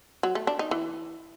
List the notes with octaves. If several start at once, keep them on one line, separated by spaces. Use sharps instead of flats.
F#3
A3
D4
D#4
E3